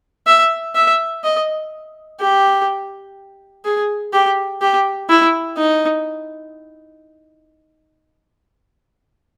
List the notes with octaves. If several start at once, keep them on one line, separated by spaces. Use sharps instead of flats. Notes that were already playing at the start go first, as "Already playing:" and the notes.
E5
E5
D#5
G4
G#4
G4
G4
E4
D#4